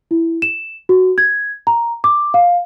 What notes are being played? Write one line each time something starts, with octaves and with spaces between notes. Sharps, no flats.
E4
E7
F#4
G#6
A#5
D6
F5